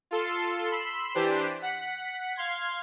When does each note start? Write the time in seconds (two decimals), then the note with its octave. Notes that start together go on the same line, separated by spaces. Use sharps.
0.11 F4 A4 C6
0.71 B5 C6 E6
1.15 E3 D4 G4 B4 C5
1.60 F#5 B6
2.36 F5 C6 G#6